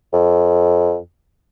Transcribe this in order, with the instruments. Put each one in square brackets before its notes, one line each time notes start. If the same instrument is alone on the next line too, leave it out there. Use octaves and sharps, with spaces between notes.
[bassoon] F2